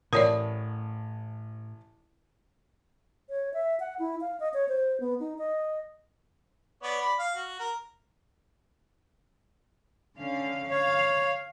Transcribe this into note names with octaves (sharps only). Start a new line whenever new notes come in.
A1 A2 A#4 C#5 D5 D#6
C#5
E5
F#5
E4
F5
D#5
C#5
C5
B3
D#4
D#5
B3 C#5 D5
D5 B5
F5
F#4
A#4
D3 C#4 F5
C#5 F5